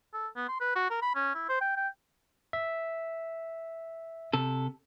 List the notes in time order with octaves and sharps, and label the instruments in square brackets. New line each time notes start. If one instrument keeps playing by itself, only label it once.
[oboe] A4
B3
C6
B4
F#4
A#4
B5
C#4
E4
C5
G5
G5
[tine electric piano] E5
[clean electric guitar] C3 A4